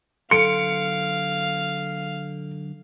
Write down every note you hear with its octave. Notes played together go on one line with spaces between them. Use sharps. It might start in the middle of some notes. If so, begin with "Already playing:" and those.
D3 F#3 A4 F5 C6 C#7 D7